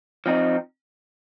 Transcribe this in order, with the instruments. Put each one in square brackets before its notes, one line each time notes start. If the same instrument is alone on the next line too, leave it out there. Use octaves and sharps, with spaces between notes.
[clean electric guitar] F3 C4 D#4